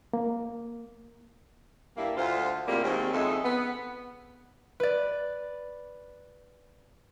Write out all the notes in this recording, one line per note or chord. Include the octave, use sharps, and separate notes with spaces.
A#3
G2 A#3 E4
D2 F4 C5
A2 C3 G3 G#3 A#3 F4
D#2 G#2 D#3 F#3 C4
F2 C#3 G#3 D#4 A4 E5
B3
B4 D5